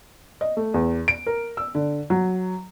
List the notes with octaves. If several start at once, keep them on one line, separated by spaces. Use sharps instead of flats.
D#5
A3
E2
D7
A#4
E6
D3
F#3